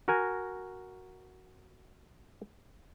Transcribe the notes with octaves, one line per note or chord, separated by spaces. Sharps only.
F#4 A#4 G#5